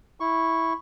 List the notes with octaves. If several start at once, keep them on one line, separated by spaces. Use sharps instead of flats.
E4 C#6